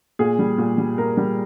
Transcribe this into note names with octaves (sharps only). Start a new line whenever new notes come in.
A#2 G#4
G3
A#2
G3
A#2 A#4
G3